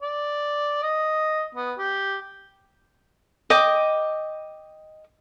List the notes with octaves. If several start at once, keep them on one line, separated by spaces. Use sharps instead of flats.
D5
D#5
B3
G4
D#5 G5 D6